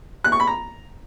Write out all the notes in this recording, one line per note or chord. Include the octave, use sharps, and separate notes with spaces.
F#6
C#6
B5
A#5